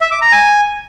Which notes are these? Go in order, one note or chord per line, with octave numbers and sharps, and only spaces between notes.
E5
D6
A#5
G#5